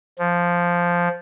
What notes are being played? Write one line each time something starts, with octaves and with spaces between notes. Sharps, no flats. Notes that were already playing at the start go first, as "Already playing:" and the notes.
F3